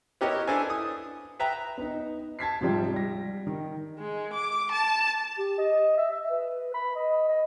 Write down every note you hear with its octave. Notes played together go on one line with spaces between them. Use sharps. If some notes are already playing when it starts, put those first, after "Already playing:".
B3 E4 G4 A#4 C#5 D#5
B3 D4 E4 A4 C5 G#5
D#6
B4 E5 G5 A#5
B3 D#4
A5 G#6 B6 C7
G#2 C3 F3 G3
G3 A#6
D#3
G#3
D6
A5
G4
D#5
E5
E5
B4
B5
D#5
D#5